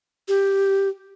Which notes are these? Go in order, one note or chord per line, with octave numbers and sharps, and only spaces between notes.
G4